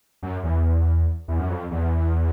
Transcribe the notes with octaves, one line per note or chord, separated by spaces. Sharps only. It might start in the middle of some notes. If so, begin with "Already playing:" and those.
F#2
E2
E2
F#2
F2
E2